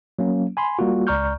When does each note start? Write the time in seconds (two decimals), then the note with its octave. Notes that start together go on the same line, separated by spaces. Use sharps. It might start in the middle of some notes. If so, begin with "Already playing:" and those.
0.19 F#3 A#3 C#4
0.57 G#5 B5 C6
0.79 G3 A#3 F4 F#4
1.07 C#2 D5 A#5 C#6 F6 G6